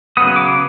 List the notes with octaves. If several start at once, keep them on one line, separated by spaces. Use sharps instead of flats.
C#3 F#3 B3 D#6
D6